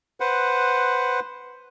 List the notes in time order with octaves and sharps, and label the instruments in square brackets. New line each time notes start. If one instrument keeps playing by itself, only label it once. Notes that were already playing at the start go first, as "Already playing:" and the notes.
[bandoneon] B4 C5 F#5